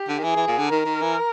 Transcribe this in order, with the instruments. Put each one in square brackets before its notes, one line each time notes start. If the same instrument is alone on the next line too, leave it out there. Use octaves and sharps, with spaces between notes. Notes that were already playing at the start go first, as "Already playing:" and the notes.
Already playing: [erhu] G4
[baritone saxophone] D3
D#3
[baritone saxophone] E3 [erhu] G#4
[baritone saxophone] E3
A#2
D3
[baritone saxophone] D#3 [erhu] A#4
[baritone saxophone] D#3
E3